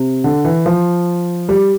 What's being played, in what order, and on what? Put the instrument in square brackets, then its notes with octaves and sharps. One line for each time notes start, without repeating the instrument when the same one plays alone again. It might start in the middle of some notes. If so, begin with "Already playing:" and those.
Already playing: [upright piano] C3
D3
E3
F3
G3